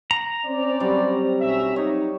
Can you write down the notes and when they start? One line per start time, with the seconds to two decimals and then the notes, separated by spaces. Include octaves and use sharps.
0.11 A#5
0.46 C4 C#4 C5 D5
0.80 F#3 G3
1.41 B1 C#4 E5
1.76 D#4 C#5